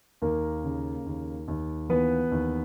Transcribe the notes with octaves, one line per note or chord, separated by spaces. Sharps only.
D#2 A#3 A#4
C#3
D#2
D#2
E3 B3 B4
D#2